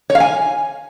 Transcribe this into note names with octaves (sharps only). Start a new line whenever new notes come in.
C#5
F5
G#5